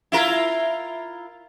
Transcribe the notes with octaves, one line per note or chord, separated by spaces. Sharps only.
E4 F4 A#4